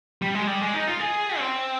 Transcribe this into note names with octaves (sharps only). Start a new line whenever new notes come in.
G3
G#3
G3
G#3
D#4
F4
G#4
C4